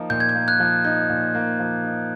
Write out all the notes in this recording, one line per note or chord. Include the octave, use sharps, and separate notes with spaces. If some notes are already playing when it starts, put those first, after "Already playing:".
Already playing: F3 A#3 D#4
A#2 G6
G#6
G6
A#3
F#6 G#6
F3
D#4 G6
A#2
A#3
F3
D#4